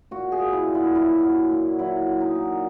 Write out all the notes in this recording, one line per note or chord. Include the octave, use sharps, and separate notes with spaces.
A#2 F#4
G#4
A#2
E4
A#2
E4
F#3 E4
F#3
A#2
F#3 E4
F#3
D#4
A#2